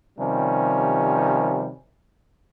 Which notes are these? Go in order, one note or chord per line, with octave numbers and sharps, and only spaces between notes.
C3 D#3 F3 G3 C#4